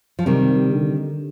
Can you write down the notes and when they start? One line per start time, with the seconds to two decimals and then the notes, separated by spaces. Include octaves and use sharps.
0.19 F3
0.26 C3 D#3 G3
0.73 D3